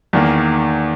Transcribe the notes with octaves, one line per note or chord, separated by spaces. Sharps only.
E2 D#3 A#3